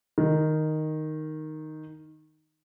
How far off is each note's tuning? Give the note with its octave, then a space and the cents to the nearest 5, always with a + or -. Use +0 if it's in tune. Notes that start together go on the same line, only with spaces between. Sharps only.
D#3 -5